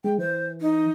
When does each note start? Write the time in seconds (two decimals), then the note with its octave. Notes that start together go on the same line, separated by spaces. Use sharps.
0.04 G#3 G5
0.18 E3 C5
0.61 D#4